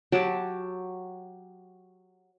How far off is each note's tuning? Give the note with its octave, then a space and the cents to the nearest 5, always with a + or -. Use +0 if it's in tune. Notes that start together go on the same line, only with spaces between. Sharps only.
F#3 -10 G4 +0 A5 +0